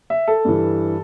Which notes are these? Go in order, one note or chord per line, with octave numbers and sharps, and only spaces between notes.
E5
A4
G2 E3